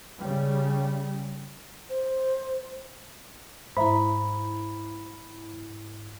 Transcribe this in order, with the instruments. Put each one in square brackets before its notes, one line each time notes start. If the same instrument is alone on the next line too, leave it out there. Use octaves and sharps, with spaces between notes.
[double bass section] C#3 G3
[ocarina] C5
[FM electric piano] G#2 E4 [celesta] C5 E5 A#5 [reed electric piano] B5